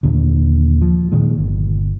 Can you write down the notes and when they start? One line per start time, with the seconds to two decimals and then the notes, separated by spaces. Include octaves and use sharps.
0.03 D#2 A#2 D3
0.81 F3
1.12 A#2 D#3 G#3
1.38 G1